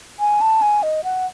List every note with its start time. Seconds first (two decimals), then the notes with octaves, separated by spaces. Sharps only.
0.20 G#5
0.41 A5
0.62 G#5
0.83 D#5
1.04 F#5